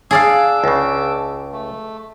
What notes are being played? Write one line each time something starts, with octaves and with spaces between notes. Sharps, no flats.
D4 G#4 D5 F5 D6 E6
C#2 C#3
A3